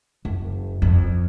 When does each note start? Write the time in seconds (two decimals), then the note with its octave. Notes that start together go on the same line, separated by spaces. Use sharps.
0.25 F#1
0.82 F2